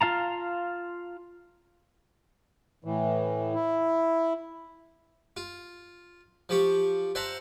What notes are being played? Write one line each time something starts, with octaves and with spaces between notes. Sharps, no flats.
F4 F5 A5 A#5
A2 E3
E4
F4
F3 G4 C#6
C5 E5 F#5 A5 A#5